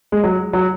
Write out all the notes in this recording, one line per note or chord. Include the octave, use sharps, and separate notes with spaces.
G#3
F#3
F#3